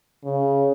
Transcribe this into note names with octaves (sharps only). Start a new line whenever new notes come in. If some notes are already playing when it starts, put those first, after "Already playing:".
C#3